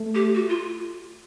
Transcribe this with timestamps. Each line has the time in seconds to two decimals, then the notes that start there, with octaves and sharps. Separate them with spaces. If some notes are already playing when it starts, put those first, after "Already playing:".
Already playing: A3
0.15 G4
0.35 F#4
0.48 F4